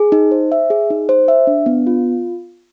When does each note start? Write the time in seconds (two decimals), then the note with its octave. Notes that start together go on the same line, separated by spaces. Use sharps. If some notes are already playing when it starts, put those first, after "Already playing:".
Already playing: G#4
0.12 D#4
0.31 C5
0.52 E5
0.70 G#4
0.90 D#4
1.09 C5
1.28 E5
1.47 D4
1.66 B3
1.87 F4